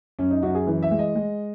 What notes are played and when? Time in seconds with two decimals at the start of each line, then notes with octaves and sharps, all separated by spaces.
0.19 F#2 C#4
0.31 D#4
0.43 F#2 F#4
0.55 G#4
0.67 E3
0.83 E5
0.91 G#3
0.99 D#5
1.15 G#3